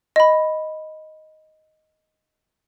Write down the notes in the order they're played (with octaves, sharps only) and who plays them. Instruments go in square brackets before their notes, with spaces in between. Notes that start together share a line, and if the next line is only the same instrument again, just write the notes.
[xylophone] D#5 B5